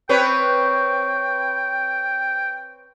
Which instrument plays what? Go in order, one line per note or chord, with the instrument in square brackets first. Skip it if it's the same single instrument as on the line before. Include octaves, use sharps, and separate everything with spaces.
[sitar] C4 B4 C#5 [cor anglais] G5